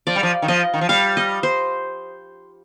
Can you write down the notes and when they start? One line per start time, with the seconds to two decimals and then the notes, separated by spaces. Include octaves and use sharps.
0.07 F3 D5
0.16 G3
0.23 F3
0.42 D#3
0.48 F3 D#5
0.74 D#3
0.81 F3
0.89 G3 F5
1.17 D#5
1.43 C5